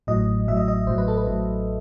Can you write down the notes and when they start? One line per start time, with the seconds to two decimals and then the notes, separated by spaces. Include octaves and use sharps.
0.07 A1 A2 F#3 D#5
0.48 A1 A2 F#3 E5
0.57 D#5
0.68 D#5
0.87 A1 A2 F#3 C5
0.98 B4
1.08 A4
1.17 B4
1.27 A1 A2 F#3